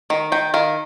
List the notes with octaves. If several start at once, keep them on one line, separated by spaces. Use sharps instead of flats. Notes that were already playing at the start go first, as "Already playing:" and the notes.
D#3
D#3 G5
D#3 F5